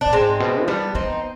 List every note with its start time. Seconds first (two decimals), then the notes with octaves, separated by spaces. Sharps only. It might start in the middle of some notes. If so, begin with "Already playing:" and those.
0.01 B2 D4
0.13 G#2 G#3 C4
0.40 B2
0.62 F3
0.68 G3 B3 D4
0.95 B3 C4 D#4